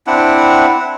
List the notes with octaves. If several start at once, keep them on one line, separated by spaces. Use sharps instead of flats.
C4 D4 E4 F#5